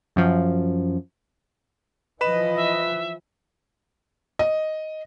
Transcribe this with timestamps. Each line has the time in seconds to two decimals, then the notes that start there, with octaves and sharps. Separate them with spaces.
0.16 F#2 F3
2.21 E3 F3 B4 D#5 B5 E7
2.56 E5
4.39 D#5